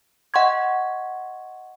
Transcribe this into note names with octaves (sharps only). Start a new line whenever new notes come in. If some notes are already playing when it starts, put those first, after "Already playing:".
D#5 F#5 C6 C#6 G#6